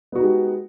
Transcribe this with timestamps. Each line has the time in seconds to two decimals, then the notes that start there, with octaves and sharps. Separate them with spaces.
0.12 B3
0.15 F#4
0.19 D#4
0.22 G#3
0.25 G4